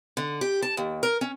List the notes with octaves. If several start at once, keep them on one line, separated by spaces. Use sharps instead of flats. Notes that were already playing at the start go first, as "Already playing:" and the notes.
D3
G4
A5
D#2
A#4
C#4